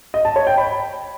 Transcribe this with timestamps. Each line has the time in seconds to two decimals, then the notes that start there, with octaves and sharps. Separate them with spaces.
0.14 D#5
0.25 A5
0.36 C#5
0.47 G5
0.58 B5